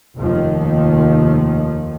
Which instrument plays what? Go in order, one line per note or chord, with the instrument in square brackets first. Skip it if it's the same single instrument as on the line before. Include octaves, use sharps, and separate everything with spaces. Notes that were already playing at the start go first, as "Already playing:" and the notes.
[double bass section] F1 D#2 D#3 F3